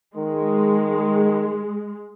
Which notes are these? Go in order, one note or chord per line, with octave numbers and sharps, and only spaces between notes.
D#3 G#3